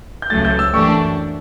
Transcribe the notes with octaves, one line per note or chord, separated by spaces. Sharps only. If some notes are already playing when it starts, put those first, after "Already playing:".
G6
C#2 C#3 F#3 A3 A6
G6
E6
F#2 E3 A3 D4 G4 C#6